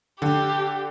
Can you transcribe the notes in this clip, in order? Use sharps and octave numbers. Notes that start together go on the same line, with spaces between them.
D3 G4